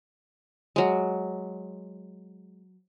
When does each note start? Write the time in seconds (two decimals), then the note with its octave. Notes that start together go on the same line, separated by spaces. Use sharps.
0.76 F#3 G#3